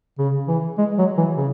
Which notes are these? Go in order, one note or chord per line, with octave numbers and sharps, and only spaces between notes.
C#3
E3
G#3
F#3
E3
C#3